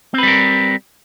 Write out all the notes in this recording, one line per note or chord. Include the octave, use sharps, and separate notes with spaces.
G3 C4 A#4 B4